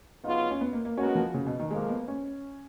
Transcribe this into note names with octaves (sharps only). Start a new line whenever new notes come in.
C#3 F#3 B3 D#4 F4
C#4
B3
A#3
A#3
B2 G#3 B3 C#4 F#4 A#4
F3
C#3
B2
D#3
F2 F3 G#3 A#3
B3
C#4